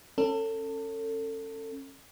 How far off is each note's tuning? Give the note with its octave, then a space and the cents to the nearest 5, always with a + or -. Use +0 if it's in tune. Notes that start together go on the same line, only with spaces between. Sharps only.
C#4 -20 A4 +30